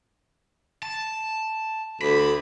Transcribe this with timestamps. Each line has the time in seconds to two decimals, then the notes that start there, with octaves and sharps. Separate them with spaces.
0.83 A5
2.02 D2 B5